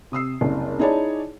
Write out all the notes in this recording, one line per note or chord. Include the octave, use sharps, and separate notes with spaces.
C3 D#6 E6 C7
F#1 C2
D#4 E4 G#4 C#5 D5 A5